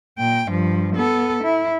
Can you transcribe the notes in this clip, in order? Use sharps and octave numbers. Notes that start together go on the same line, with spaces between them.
A#2 G5
G2 F3
B3 A4
E4